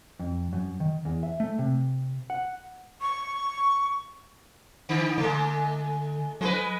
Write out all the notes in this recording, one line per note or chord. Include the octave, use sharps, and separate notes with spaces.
F2
F#2
D#3
E2
E5
A3
C3
F#5
C#6
D3
D3 G#3 A3
F#3 G#3 E4 B4